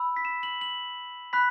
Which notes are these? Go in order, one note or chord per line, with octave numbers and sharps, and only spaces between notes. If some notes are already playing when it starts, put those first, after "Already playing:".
Already playing: B5 E6
B6
E7
F#7
F#7
B5 F#6 B6